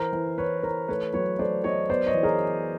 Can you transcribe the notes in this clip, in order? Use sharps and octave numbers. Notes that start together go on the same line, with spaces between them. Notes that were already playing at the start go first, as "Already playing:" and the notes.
Already playing: E3 A#4 C5
E3
E3 B4 C#5
E3 A#4 C5
A3 B4 C#5
F#3 B4 C#5
A3 C5 D5
F#3 C#5 D#5
B3 C5 D5
C#5 D#5
E3
G#4 A#4